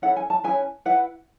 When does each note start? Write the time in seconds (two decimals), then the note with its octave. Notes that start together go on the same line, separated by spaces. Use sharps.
0.02 C#4 E4 A4 F#5
0.16 G#5
0.30 A5
0.44 C#4 E4 G#4 B4 G#5
0.85 E4 B4 F#5